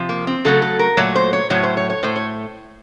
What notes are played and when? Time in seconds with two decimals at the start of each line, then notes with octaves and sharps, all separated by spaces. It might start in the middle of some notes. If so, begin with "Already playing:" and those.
Already playing: C3 F3
0.09 A#3
0.27 C4
0.45 C#3 F#3 A3 A4
0.62 A4
0.79 A#4
0.97 A#2 F#3 A3 C#5
1.15 C5
1.33 C#5
1.50 A2 F#3 A3 C#5
1.63 C5
1.77 C#5
1.90 C#5
2.03 A2 A3 C5
2.16 C#5